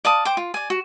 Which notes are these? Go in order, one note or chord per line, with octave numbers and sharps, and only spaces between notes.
D5 F5 A5 D#6
C5 G5 D6
F4
D5 G#5
F#4